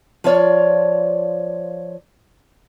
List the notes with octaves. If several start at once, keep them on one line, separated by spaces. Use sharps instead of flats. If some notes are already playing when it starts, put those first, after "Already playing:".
F3 F4 C#5 D5